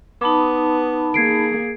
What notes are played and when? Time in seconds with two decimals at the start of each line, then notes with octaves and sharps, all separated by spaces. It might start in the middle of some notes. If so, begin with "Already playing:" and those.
0.21 B3 D#4 A5 B5 D6
1.14 A#3 G#4 G#6 C7 D7